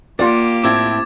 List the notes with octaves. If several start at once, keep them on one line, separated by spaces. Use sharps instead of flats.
A#3 F4 G4 D5 F#5
A2 C4 E4 D6 G#6 A6